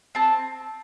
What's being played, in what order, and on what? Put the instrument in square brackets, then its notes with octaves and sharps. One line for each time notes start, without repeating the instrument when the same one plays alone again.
[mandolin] C4 A5